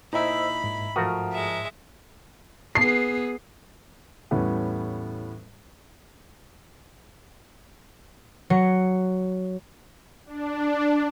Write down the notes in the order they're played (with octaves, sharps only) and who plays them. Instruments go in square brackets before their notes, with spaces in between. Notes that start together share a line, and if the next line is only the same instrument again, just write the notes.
[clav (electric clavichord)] A#2 [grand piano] D#4 E4 [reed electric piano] C5 D#5 E6 [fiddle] B5
[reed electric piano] G#2
[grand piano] F3 A#4 D#6 [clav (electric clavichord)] A3 F#4 F5
[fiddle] G#3 E5
[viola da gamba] B3 G#4 B4 [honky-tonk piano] C7
[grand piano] E2 A2 G3 B3 C#4
[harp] F#3 C#7
[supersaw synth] D4